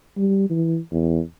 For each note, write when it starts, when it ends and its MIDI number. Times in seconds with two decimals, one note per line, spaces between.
0.17 0.47 55
0.50 0.78 52
0.92 1.20 40